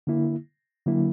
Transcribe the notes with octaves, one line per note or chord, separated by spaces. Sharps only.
D3 A#3 E4
D3 F#3 A#3 E4